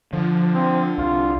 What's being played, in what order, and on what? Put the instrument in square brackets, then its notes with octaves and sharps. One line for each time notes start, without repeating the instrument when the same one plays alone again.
[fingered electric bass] D3 [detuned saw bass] F3
[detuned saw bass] F3 [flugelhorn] C4
[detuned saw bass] C2 [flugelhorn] F4